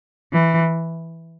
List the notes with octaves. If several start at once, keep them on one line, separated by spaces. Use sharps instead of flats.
E3